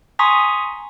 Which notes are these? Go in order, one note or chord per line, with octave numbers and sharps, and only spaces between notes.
G#5 A#5 C6 C#6 D#6 B6